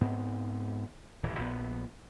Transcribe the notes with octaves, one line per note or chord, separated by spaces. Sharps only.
G#2 B3 C4
D#1 A2 E3
A#1 B3